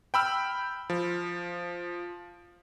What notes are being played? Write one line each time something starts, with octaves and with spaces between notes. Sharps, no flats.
G5 B5 E6 F6
F3